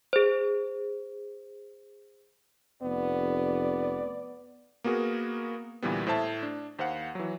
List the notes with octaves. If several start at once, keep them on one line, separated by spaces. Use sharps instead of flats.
G#4 C5
F1 B3 D5
A#3 B3 F#4 G#4 A#4
D2 A#2 E3 G3 B3
A2 C5 E5 A5
D4
D#2 C5 F5 F#5
E3 F#3